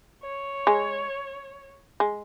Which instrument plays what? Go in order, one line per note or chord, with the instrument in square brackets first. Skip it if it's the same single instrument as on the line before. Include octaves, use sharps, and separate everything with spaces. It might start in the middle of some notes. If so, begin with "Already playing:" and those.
[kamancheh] C#5
[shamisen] G#3
G#3